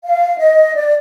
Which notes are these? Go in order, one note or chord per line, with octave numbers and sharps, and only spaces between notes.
F5
D#5
D5